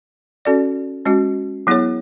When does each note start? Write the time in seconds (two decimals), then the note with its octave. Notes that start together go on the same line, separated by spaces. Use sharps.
0.45 C#4 F#4 A4 D5
1.06 G#3 C#4 F#4
1.67 F#3 B3 E4 G#4 C#5